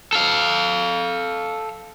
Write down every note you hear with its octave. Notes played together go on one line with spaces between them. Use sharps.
A4 F5